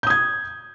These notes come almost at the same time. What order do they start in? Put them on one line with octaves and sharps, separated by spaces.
G6 D#6 G#6